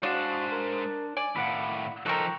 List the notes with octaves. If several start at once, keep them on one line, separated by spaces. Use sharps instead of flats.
G#3 D4 F#4 C5 F5 C#6
A#4
D5 G#5
A2 D#3 F5 F#5 B5
F3 D#4 A4 A#4 G5 C#6 F#6